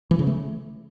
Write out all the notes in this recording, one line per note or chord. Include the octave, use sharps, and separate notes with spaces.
E3
C#3
A3